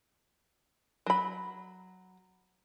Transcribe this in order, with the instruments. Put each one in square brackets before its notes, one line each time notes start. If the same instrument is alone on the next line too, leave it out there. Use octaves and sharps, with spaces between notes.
[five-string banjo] F#3 B5